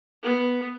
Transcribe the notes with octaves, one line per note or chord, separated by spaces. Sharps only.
B3